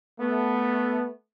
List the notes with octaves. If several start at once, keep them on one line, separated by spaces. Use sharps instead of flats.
A3 B3